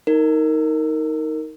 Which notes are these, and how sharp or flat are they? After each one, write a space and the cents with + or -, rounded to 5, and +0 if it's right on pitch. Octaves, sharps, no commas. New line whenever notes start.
D#4 +15 A#4 -15